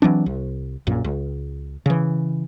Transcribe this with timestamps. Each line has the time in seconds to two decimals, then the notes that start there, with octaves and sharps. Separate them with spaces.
0.02 E3 F#3 C4 D4
0.26 C2
0.87 A#1 F#2 A#2
1.04 C#2
1.86 C#3 E3